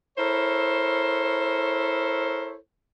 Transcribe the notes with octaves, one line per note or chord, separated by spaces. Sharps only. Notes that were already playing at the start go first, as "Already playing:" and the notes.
E4 A4 A#4 C5 C#5